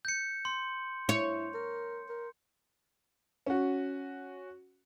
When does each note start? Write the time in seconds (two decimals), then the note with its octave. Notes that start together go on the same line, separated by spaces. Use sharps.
0.05 G6 C#7
0.45 C6
1.09 E4 C#5
1.54 A#4
2.09 A#4
3.46 C#4 F#4